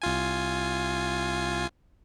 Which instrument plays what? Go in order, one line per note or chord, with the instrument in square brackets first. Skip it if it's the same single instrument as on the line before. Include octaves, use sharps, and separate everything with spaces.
[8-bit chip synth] C2 F4 G#5